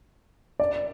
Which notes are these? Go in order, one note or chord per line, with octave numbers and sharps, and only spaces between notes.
D5